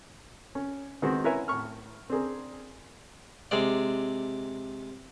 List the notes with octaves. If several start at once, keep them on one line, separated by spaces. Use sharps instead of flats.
C#4
D#3 G#3 B3 C4 F#4
E4 A#4 B4 C#5 E5 G#5
A2 C#6 F6
C4 D4 G#4 A#4
C3 G#3 D5